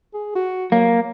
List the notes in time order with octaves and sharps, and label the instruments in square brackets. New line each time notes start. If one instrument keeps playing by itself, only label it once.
[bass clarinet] G#4
F#4
[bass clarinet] F#3 [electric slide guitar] A#3